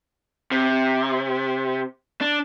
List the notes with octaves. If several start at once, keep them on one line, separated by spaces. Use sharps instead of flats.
C3
D4